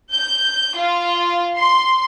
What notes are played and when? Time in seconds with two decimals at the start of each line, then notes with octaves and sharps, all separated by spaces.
0.13 G6
0.77 F4
1.58 C6